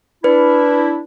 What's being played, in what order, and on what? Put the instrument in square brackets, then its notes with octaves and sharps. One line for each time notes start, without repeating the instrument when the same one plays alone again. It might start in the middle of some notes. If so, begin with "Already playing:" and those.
[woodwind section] D4 E4 [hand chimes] B4